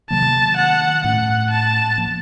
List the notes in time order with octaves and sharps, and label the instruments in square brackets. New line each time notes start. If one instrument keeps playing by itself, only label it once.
[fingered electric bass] C3 D#3 F#3 A#3 [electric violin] A5
[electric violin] F#5
[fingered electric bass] A2 A3 C#4 [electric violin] F#5
[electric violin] A5
[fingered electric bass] F3 A#3